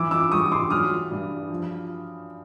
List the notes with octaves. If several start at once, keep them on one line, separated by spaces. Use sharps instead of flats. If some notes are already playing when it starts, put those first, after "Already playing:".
Already playing: E3 D6 E6
D6 E6
G3 C#6 D#6
C6 D6
F#3 D#6 F6
G2
F3